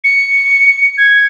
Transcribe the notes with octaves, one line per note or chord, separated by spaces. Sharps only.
C#7
G#6